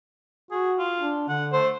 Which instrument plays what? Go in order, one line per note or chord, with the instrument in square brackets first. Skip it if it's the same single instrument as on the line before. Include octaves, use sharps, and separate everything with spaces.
[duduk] F#4 [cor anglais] G#4
[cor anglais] F4
[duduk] D4
[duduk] D3 [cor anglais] F#5
[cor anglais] A3 [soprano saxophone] C5